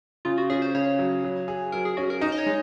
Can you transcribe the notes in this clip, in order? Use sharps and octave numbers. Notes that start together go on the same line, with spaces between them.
C#3 F4
F#4
C#4 G#4
C5
C#3 C#5
F#3
F#3
G#4
F#3 A#4
G#4
C#4 F#4
A#4
D#4 C5
D#5
C#5
G#3